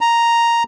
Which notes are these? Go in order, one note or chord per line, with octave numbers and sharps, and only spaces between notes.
A#5